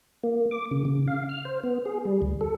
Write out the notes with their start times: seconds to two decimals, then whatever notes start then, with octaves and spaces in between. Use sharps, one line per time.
0.23 A#3
0.51 D6
0.71 C#3
0.85 C#3
1.08 F5
1.29 F6
1.45 C5
1.63 B3
1.85 G#4
2.05 G3
2.22 D2
2.41 A4